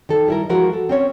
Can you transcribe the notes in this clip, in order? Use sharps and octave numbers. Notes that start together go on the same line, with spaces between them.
D#3 A4
G3 E4 A#4
F3 G#3 E4 F#4 A#4
A4
C4 C#4 C#5